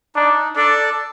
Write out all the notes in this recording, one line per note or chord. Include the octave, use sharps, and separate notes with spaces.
D4 D#4
D4 A4 D5